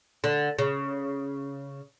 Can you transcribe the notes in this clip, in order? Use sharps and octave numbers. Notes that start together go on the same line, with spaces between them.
D3
C#3